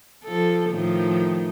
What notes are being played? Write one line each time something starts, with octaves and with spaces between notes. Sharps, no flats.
F3 A4
A2 D#3 F3